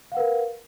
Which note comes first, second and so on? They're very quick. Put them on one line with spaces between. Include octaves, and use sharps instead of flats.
F5 F#5 B4 A#4